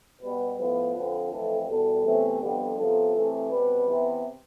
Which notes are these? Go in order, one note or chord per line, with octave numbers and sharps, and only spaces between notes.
B2 G3 B3 B4
A2 F3 B3 B4
F2 D3 F3 C4
F2 E3 A3 C4 A4
E2 B2 G3 A4
E2 C3 E3 A3 C4
F2 D3 G3 B3 G4
C3 F3 B3 A4
C3 E3 A3 C4
B2 G3 C4 B4
C3 E3 B3